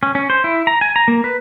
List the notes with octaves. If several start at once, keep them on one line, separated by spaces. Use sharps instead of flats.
C#4
C#4
C5
E4
A#5
G#5
A#5
A#3
B4